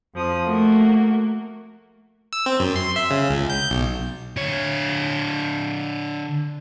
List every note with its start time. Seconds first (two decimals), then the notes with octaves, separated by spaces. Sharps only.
0.13 F2 F3 D#6
0.45 A3 A#3 F#4
2.33 E6
2.46 C4
2.60 F#2
2.76 C6
2.96 E5
3.11 C#3
3.30 C#2
3.50 G6
3.71 B1
4.37 D3 C#5